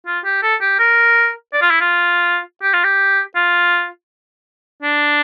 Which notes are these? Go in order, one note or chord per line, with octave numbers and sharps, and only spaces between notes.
F4
G4
A4
G4
A#4
D5
F4
E4
F4
G4
F4
G4
F4
D4